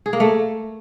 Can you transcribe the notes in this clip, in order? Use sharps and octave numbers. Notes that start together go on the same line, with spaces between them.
G#4
A#3
A3